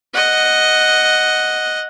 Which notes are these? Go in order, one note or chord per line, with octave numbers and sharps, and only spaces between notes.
D#5 F#5